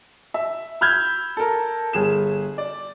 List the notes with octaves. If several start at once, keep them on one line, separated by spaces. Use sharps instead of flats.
E5
B5 E6 F6 G6 G#6
A4 A#4
G1 G#4 E7
D5